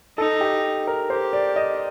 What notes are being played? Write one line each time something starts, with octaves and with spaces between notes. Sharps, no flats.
D#4 A4
G4
A#4
G4 C5
D5
D#5